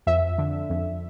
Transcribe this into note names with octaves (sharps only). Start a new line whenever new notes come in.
F2 E5
D3
F2